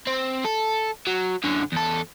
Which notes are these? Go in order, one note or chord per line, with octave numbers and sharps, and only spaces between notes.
C4
A4
F#3
F#2 D3
E2 A4